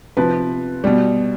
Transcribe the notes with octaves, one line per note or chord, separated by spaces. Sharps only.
C3 F3 B4
B2 G3